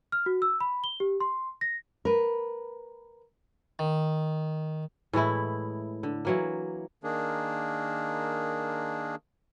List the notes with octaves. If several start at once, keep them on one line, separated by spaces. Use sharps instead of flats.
F6
F#4
E6
B5
G7
G4
C6
A#6
A#4 B4
D#3
A2 E3 G#3 E4
D3
E3 F#3 A#3
D#3 A#3 D4 G#4